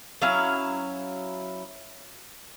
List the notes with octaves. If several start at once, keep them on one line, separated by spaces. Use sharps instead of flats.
F#3 C#4 E4 F5